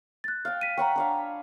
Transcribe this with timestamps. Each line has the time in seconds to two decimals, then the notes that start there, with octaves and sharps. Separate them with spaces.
0.24 F#6 A6
0.45 F5 G5
0.61 B6 D#7
0.78 C#5 F#5 G5 A#5 B5
0.96 D4 C#5 F5